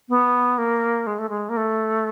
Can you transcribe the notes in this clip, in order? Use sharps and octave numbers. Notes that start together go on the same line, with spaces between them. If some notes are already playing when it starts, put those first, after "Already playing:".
B3
A#3
G#3
A3
G#3
A#3
A3